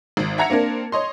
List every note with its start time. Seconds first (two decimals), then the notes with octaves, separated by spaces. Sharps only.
0.17 G#1
0.38 E5 F#5 A#5 G#6 A#6 C#7
0.50 A#3 C4 D4 A#4
0.92 C#5 D#5 C6